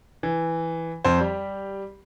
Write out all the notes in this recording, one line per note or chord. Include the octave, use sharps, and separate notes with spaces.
E3
F2 C5
G3 G4